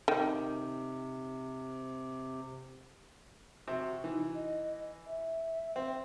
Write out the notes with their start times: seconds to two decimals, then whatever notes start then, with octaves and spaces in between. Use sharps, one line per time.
0.08 C3 D#3
3.68 C3 F#4
4.04 E3 D#4
4.34 D#5
5.06 E5
5.76 C4